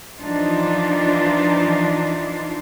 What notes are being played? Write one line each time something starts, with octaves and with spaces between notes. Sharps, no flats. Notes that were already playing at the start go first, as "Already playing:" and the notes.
E3 F3 D4 D#4 F4